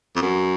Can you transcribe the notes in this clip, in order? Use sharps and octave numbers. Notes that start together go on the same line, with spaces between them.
F2
F#2